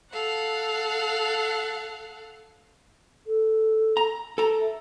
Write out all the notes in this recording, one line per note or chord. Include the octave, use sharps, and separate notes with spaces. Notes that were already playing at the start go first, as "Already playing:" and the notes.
A4 F5 F#5
A4
A#5
A4 A#5
E5